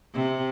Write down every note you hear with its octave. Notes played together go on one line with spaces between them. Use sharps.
C3